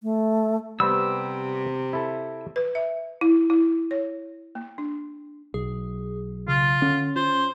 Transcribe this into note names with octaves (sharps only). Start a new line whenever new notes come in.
A3
C3 G3 B3 C4 E6
E4 A4
B4
E5
E4
E4
C#5
A#3
D4
B1 G#4
C#3 F4
D3 C#4
F4 C5